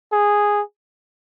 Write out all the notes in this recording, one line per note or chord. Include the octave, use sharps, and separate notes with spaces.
G#4